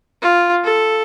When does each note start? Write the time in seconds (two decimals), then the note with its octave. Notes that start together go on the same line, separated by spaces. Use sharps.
0.22 F4
0.64 A4